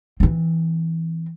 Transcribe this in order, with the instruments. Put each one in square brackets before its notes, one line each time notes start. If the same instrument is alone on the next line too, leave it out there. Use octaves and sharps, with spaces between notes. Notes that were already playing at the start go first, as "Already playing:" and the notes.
[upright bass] E3 C4